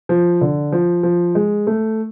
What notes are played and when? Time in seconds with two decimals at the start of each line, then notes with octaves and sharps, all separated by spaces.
0.09 F3
0.41 D3
0.72 F3
1.03 F3
1.35 G#3
1.67 A3